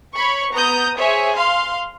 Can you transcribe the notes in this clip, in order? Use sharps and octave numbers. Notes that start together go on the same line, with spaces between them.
C#5 B5 C#6
B3 A#5 D#6 G6
G#4 C5 C#5 E5
F5 C6